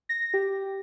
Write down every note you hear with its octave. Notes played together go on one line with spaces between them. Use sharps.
A#6
G4